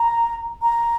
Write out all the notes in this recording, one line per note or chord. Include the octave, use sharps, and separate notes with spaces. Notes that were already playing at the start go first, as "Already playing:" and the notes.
Already playing: A#5
A#5